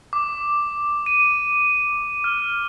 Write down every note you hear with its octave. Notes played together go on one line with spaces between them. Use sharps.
D6
D#7
F6